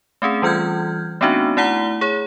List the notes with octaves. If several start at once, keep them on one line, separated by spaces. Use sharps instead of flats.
A3 C4 C#4 G#4
E3 G3 F4 F6 G6 G#6
A3 B3 C4 D4 D#4 F#4
A3 E4 F#5 A#5 G7
G#4 C#5